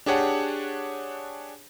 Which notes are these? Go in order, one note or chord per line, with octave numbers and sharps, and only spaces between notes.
D4 G4 G#4 C#5 F#5 A5